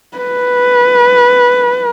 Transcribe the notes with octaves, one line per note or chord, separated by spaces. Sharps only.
B4